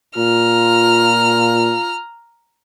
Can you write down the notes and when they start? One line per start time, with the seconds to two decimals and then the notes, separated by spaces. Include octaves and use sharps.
0.17 A#2 F4 A#5 F6